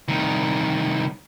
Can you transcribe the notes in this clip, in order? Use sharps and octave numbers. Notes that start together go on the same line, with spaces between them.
C2 D#3